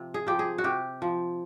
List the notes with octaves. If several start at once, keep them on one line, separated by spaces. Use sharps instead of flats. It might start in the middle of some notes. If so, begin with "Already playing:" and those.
Already playing: C3 F3
G#4
F3 G4
G#4
F#4
C3 G4
F3